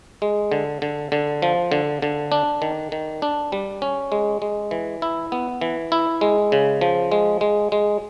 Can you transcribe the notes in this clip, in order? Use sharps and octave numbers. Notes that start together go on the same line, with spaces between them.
G#3
D3
D3
D3
F3
D3
D3
D4
D#3
D#3
D4
G3
C#4
G#3
G#3
E3
E4
B3
E3
E4
G#3
C#3
F3
G#3
G#3
G#3